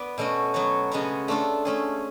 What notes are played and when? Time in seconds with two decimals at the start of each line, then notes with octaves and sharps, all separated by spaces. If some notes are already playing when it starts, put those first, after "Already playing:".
Already playing: B3 B4 D5
0.18 B2 A3 C#4 F#4
0.54 F#3 B3 F#4 C#5
0.92 C#3 G#3 B3 F#4 C#5
1.28 A3 D4 F4 A4
1.65 A3 C#4 G#4